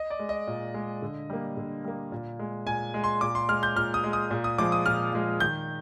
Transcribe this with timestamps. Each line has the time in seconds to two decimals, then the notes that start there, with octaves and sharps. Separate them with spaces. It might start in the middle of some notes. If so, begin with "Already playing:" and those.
Already playing: D#5
0.10 D5
0.19 G#3
0.29 D#5
0.47 A#2
0.74 G#3
1.02 D3
1.30 G3 A#3
1.57 D3
1.84 G3 A#3
2.12 A#2
2.39 G#3
2.66 A#2 G#5
2.94 G#3
3.04 C6
3.21 A#2 D6
3.35 C6
3.49 G#3 F6
3.63 G6
3.76 A#2 F6
3.94 D#6
4.04 G#3
4.13 D#6
4.31 A#2
4.44 D#6
4.58 F3 G#3 D6
4.72 D#6
4.86 A#2 F6
5.13 F3 G#3
5.40 D#3 G6